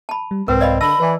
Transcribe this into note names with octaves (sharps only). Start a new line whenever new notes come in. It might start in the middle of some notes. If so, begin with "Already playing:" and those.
A5 B5
G3
C2 G#2 C4 A#4 B4
D5 D#5 F5 B5
D3 A5 B5 E6 A#6
E3 B4 D5 G#5